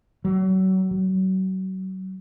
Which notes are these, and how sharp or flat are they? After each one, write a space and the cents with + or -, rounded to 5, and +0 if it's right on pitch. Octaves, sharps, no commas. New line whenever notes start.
F#3 +30
F#3 +30